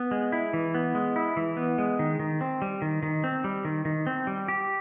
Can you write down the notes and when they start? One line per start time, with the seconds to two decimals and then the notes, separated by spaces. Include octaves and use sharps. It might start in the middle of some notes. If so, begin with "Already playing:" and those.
Already playing: B3
0.11 G#3
0.32 E4
0.53 E3
0.75 B3
0.95 G#3
1.16 E4
1.37 E3
1.57 B3
1.78 G#3
1.99 D#3
2.19 D#3
2.41 C4
2.62 G3
2.82 D#3
3.03 D#3
3.24 C4
3.44 G3
3.65 D#3
3.85 D#3
4.07 C4
4.27 G3
4.48 G4